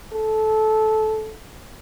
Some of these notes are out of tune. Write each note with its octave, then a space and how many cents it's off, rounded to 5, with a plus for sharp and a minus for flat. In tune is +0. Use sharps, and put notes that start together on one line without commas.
A4 -20